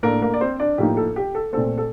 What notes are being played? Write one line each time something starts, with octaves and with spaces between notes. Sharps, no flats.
A2 A3 A#3 D4 A#4
A#3 A#4
D5
C4 C5
D4 D5
A2 F3 A#3 D#4 G4
A4
G4
A4
A#2 A3 C4 A4
A4